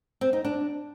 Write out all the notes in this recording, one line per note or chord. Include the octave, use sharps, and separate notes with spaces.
C4
D#4
D4